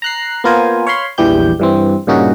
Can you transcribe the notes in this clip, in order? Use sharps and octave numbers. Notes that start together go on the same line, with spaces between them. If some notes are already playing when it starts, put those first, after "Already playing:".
A#5 F#6 C7
A#3 B3 F4 A#4 C5 G#5
C#5 F5 B5 C6
A#1 E2 E3 G3 G4 G6
G2 E3 C4
G2 A#2 C#3 C#4 D#4 F#4